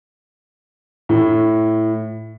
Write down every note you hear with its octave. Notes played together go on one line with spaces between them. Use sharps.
A2